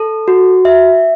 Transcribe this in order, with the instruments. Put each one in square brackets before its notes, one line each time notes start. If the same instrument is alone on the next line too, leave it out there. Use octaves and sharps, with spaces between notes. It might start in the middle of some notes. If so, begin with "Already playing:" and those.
Already playing: [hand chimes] A4
F#4
E5